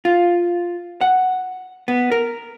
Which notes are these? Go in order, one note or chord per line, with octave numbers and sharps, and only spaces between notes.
F4
F#5
B3
A#4